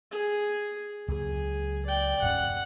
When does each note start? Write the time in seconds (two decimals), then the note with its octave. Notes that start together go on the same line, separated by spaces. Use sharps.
0.11 G#4
1.08 C#2 F#3 A#3 G#4
1.86 D5 G5
2.22 D#1 G2 C#4 F#5